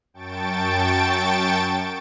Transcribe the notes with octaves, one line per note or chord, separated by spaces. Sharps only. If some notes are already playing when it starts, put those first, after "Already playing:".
F#2 G5 A5 C#6 A6 D7